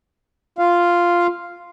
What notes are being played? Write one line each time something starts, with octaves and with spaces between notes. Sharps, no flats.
F4 F5